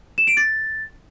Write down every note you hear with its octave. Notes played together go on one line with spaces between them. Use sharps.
E7
D7
A6